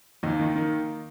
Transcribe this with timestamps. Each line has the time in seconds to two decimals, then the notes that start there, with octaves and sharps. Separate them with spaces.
0.23 D#2 A#3 D#4
0.40 D#3
0.56 D#3